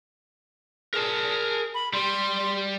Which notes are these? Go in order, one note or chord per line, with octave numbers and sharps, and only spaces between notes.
G#4 A#4 A5
B5
G3 C6